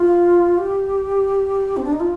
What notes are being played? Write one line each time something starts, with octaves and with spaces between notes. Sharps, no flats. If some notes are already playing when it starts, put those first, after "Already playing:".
Already playing: F4
G4
C4
D4
D#4
F4